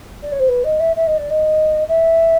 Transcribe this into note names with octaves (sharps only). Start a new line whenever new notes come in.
D5
C#5
C5
B4
D#5
E5
E5
D#5
D5
D#5
E5